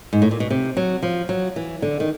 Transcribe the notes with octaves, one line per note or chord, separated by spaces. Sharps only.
G#2
A2
A#2
B2
C3
F#3
F3
F#3
E3
D3
D#3